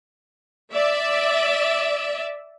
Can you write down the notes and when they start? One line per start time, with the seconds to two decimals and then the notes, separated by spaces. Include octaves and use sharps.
0.73 D5 E5